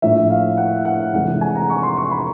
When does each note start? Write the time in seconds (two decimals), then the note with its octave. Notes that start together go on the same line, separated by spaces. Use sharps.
0.02 A#1 A2 F3 E5
0.30 F5
0.57 F#5
0.85 F#5
1.13 F1 F2 C3 E3 G#3 F#5
1.28 F#5
1.41 G#5
1.55 A#5
1.70 C#6
1.83 C6
1.97 C#6
2.11 B5